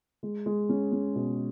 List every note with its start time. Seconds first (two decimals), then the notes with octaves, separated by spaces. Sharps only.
0.23 G#3
0.46 G#3
0.69 C#4
0.92 C#4
1.15 B2